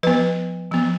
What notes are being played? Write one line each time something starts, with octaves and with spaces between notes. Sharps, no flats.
F3 B3 B4
F3 B3